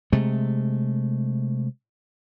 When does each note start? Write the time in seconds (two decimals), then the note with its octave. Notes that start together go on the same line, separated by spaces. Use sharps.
0.12 C3 G#3 A3